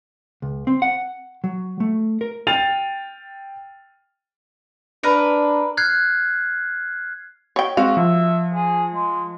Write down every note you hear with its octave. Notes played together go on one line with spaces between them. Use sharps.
C#2
C4
F#5
F#3
A3
A#4
G5 F6 A6 C7 D#7 F7
D4 A#4 B4 A#5
F6 F#6 G#6 C7
C#5 G5
G#3 C4 F#4 F5
F3 E5
G#4
G#3